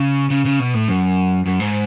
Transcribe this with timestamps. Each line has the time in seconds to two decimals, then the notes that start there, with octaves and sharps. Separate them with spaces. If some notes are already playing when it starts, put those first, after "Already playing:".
Already playing: C#3
0.30 C#3
0.45 C#3
0.59 B2
0.74 A2
0.88 F#2
1.46 F#2
1.60 G#2